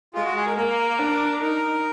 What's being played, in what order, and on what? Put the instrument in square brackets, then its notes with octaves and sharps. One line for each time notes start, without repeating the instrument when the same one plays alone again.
[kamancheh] G#3 [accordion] F4
[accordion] F#4
G#4
A#4
[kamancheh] A#3 [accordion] A#4
[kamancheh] D4
[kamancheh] D#4 [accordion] A#4